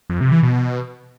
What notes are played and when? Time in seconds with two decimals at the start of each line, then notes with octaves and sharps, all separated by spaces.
0.10 F2
0.21 C3
0.32 E3
0.43 B2